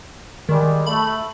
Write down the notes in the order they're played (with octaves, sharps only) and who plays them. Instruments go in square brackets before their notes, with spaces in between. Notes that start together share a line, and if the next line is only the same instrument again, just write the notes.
[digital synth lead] D#3 [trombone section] G3 G#3
[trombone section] A3 [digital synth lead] B5